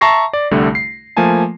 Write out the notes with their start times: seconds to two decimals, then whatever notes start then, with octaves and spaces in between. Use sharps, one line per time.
0.01 E5 A5 A#5 C#6 A#6 C7
0.33 D5
0.51 C2 D3 G3 A3
0.75 C7
1.17 F3 A3 A#3 G#5 A5